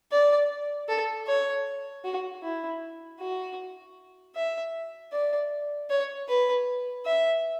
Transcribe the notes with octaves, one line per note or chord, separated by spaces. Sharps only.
D5
A4
C#5
F#4
E4
F#4
E5
D5
C#5
B4
E5